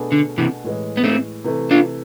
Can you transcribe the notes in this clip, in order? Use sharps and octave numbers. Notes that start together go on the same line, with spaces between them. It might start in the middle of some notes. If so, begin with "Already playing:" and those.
Already playing: B2 A3 D4 G#4 B4
D3
C3 E3
A2 E3 G#3
B3
A3 C4
C3 E3 A3
D4 F4